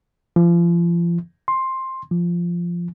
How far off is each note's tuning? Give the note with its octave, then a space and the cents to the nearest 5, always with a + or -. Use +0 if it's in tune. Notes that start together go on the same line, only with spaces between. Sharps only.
F3 -35
C6 +10
F3 -10